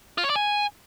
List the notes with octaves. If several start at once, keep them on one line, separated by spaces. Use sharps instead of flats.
F4
C#5
D5
G#5